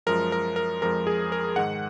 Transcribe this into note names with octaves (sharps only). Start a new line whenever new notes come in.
F#2 F3 G#3 A#4
A#4
A#4
F2 F3 G#3 A#4
G#4
A#4
G#2 D#3 G#3 F#5